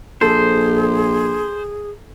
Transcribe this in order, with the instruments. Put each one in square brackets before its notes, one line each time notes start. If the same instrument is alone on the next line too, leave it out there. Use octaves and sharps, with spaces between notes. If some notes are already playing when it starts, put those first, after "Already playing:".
[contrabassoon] A#1 [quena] G#4 [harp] A4 [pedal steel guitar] C5